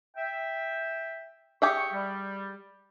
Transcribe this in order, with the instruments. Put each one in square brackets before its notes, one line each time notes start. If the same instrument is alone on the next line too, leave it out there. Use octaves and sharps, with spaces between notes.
[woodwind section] E5 G5
[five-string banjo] G4 G#4 E5 [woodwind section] C#6
[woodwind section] G3